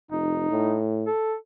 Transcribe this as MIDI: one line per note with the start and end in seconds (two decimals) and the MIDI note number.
0.11 0.48 29
0.11 0.78 63
0.50 1.07 45
1.07 1.35 69